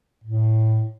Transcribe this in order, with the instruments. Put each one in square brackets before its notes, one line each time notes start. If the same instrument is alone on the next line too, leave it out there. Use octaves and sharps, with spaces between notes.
[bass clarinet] A2